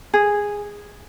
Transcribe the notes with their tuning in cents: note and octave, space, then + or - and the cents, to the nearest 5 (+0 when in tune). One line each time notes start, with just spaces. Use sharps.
G#4 -10